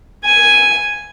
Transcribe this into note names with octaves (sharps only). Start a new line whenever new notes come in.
G#5